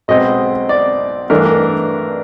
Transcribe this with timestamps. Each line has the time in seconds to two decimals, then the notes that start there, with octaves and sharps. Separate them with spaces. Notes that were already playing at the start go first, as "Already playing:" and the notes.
0.08 B1 B2 G#3 C4 D#5
0.69 D5
1.30 G2 E3 A3 D4 A#4
1.45 A#4